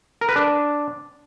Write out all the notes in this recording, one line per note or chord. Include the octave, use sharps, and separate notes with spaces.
A#4
B4
D4